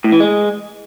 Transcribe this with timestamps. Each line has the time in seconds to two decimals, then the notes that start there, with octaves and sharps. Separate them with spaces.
0.04 A2
0.12 E3
0.20 G#3